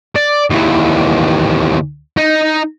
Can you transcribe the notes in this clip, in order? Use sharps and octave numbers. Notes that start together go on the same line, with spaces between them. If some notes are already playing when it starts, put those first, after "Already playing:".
D5
D#2 E3
D#4